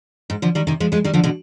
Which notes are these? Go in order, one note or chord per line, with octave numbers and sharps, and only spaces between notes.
G#2
D3 F3
D#3 G3
C3 D#3
F3 G#3
F3 G#3
D#3 G3
D3 F3
B2 D3